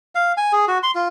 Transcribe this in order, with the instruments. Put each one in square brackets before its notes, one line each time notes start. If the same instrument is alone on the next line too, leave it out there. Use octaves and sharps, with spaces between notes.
[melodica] F5
G#5
G#4
F#4
C6
F4